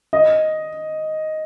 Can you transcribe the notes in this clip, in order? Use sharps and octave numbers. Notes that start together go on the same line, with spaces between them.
D#5